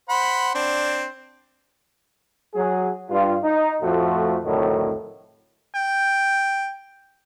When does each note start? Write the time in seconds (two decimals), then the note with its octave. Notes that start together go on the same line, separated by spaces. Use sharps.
0.09 C5 F#5 B5
0.55 C4 D4
2.55 F#3 G#4
3.10 G2 F4
3.44 D#4
3.82 F2 A2 F3 A3 F#4
4.44 C2 F2 A2 D3 D#3 F#3
5.74 G5